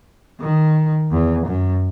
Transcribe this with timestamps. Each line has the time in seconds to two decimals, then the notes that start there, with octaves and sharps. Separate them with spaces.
0.40 D#3
1.11 E2
1.46 F#2